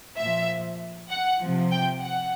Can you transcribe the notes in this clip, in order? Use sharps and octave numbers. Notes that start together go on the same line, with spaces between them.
A#2 F3 E5
F#5
C3 F3
G5
F#5